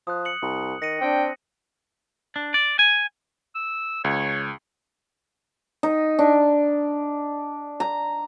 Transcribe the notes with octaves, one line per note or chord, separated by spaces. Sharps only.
F3 D#6 F#6
C#7 F#7
C2
D#3 A#6 C#7 D#7
C4 D4 G5
D4
D5
G#5
E6
C#2 C#5
D#4
D4
A#5